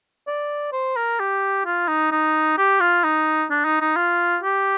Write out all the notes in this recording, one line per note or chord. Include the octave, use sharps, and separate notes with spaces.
D5
C5
A#4
G4
F4
D#4
D#4
G4
F4
D#4
D4
D#4
D#4
F4
G4